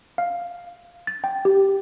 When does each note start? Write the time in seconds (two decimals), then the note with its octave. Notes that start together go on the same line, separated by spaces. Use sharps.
0.18 F5
1.07 A6
1.24 G5
1.45 G4